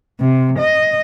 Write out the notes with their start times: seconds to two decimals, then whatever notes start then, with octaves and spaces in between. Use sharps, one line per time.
0.20 C3
0.58 D#5